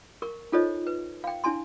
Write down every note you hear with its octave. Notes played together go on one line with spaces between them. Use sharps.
A#4 C#6
D#4 F4 A4 C5 C#5 D#5
B4
F5 G5
D4 E4 G#5 A5 C6